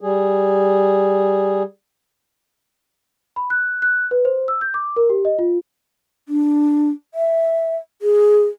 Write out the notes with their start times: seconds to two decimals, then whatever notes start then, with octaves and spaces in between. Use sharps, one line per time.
0.01 G3 G#4
3.36 B5
3.50 F#6
3.82 F#6
4.11 B4
4.25 C5
4.48 E6
4.61 G6
4.74 D6
4.96 A#4
5.10 G4
5.25 D#5
5.39 F4
6.29 D4
7.14 E5
8.02 G#4